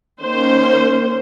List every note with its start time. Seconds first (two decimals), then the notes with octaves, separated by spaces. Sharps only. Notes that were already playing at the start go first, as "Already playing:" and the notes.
0.21 D#3 A#3 C#4 C5